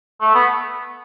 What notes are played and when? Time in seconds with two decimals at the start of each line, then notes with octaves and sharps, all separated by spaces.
0.21 A3
0.35 B3